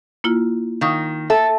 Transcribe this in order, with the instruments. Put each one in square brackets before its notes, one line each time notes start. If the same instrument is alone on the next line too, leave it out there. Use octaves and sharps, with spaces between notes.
[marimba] A#3 E4 F4
[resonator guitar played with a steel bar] D#3 [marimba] F5 C#6 D#6
[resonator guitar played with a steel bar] A4 [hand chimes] E5 A5